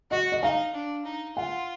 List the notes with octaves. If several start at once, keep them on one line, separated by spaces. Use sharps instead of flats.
F#4 D#5
D#5
D#4 F5
D4
D#4
F4 F#5